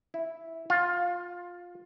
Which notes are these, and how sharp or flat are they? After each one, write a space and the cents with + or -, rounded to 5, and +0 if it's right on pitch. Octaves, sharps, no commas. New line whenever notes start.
E4 -5
F4 +15